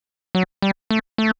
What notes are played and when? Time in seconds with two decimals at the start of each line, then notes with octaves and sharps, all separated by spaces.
0.35 F#3
0.62 G3
0.91 A3
1.18 A3